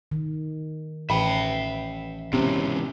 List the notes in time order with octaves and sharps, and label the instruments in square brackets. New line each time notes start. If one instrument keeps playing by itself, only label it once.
[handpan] D#3
[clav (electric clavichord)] A1 [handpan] B4 [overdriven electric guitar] E5 G5 [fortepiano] B5
[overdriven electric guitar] G#2 E3 [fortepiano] C3 [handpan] B3 C#4